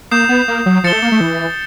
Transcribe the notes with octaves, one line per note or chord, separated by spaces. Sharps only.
A#3 D#6 G6 C7 E7
B3
A#3
F#3
F3 A6 C#7 E7 G7
A3
A#3
A3
E3